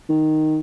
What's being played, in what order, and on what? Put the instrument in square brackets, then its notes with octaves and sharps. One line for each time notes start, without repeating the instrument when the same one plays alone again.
[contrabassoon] D#3